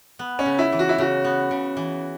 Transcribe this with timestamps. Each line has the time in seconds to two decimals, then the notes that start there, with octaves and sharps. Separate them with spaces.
0.19 B3
0.39 C#4
0.46 C#3
0.59 E4
0.72 E3
0.79 F#4
0.89 E4
0.98 C#3 F#4
1.24 B3
1.51 C#3
1.77 E3